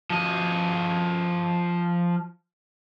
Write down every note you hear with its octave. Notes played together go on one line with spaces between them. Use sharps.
F3 D#5